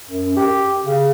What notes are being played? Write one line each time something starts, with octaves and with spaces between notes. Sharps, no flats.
F#2
G4
C#3